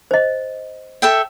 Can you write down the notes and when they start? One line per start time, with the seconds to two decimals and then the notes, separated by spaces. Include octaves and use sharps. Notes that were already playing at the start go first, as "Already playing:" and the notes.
0.11 C5 D#5
1.02 A4 E5 G5